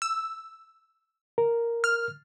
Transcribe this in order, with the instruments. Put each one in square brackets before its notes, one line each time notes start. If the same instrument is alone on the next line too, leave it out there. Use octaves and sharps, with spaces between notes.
[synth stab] E6
[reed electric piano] A#4
[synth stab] F6